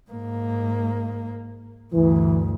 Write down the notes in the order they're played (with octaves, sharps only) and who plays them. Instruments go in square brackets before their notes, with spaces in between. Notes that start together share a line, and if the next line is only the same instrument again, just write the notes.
[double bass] G#2 A#3
[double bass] D2 G2 [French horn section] E3